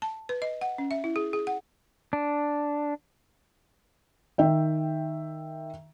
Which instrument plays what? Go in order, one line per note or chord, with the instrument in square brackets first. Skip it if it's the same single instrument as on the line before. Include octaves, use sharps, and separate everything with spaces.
[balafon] A5
B4
D#5
F#5
C#4
E5
E4
G#4
G#4
F#5
[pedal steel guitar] D4
[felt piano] D#3 E5 G5